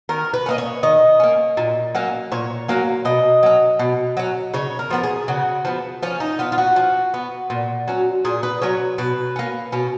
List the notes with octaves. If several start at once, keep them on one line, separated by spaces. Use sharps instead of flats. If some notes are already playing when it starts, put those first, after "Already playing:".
D#3 A#4
B4
A#3 C#4 D#5
C#5
D#3 D#5
A#3 C#4
A#2
F#3 A#3 C#4
A#2 C#5
F#3 A#3 C#4
B2 D#5
F#3 C#4
B2
F#3 C#4
C#3 C#5
A#4
F3 B3 A#4
G#4
C#3 F#4
F3 B3
F3 C#4
D#4
B3 F4
F4
F#4
F3
B3
A#2
F#3 C#4
A#2 G#4
B4
F#3 C#4 C#5
B2 B4
A#3 C#4
B2 C#4